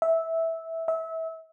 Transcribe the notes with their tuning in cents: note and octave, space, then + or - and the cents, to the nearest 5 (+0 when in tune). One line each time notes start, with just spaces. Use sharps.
E5 -15
E5 -25